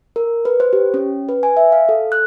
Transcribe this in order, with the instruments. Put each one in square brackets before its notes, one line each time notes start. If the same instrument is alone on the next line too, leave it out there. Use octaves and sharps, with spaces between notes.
[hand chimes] A#4
B4
C5
G4
C#4
B4
G#5
E5
F5
A4
F#6